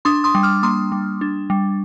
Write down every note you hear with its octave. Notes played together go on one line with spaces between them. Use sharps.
D4 C6 D#6
C6 D#6
G3
D6 F6
A#3 C6 D#6
G3
D4
G3